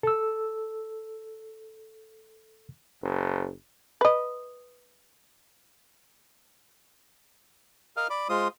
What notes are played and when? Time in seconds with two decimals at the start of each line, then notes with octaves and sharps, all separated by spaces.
0.03 A4 E6
3.02 F#1
4.01 B4 D#5
7.97 A#4 D#5 F5 F6
8.10 D5 B5 D6
8.29 G#3 F4 C5 D#6